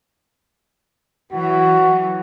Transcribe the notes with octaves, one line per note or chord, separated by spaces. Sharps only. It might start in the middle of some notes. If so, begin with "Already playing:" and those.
E3 F#3 F#4